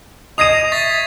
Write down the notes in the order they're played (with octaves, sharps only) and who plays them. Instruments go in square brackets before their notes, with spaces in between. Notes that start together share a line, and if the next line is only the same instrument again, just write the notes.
[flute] D#5 [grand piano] D#6 A#6 D#7 [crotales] G#6 C7 F7
[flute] E5 [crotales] C#6 A6 B6